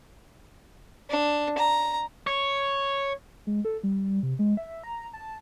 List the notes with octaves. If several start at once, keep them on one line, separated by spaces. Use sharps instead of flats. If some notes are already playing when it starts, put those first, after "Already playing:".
D4
A#5
C#5
G#3
A4
G3
C3
G#3
E5
A#5
A5